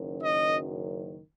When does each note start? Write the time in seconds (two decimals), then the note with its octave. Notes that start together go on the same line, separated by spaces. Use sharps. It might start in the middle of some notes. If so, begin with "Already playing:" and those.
Already playing: F#1 F#2 D#3
0.24 D#5